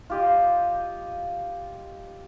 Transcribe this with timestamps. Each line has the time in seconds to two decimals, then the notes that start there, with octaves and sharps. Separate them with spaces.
0.10 F4 G4 D#5